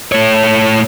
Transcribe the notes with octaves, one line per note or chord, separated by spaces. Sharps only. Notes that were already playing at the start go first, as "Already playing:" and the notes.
A3 C#5